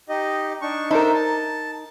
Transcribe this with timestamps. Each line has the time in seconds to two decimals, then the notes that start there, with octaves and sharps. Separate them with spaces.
0.09 D#4 G4 D#5
0.61 D4 D#4 C#6
0.91 D4 D#4 A#4 C5 E5
1.14 A5